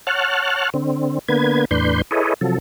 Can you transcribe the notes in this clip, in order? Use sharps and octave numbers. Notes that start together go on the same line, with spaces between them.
C#5 F#5 A5 F6 F#6
D3 C4
D3 A#3 B3 B4 G#6
E2 A2 D4 B4 C6 G6
E4 G#4 A4 B4 C#5 D#5
C3 F3 F#3 A4